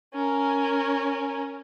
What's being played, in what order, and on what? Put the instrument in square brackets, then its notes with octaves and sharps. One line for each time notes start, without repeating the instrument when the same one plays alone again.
[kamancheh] C#4 A#4